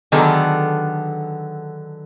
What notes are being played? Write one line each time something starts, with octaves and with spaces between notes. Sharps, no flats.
D3 D#3 F#3 B3 G#4 A4